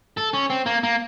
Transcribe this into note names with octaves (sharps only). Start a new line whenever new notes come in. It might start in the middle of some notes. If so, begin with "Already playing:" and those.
A4
C#4
C4
A#3
A#3